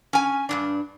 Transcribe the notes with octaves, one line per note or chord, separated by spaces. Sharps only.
C#4 G#5
G2 A#2 D4